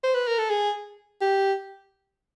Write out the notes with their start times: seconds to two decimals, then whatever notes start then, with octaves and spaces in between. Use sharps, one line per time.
0.04 C5
0.15 B4
0.27 A#4
0.38 A4
0.50 G#4
1.21 G4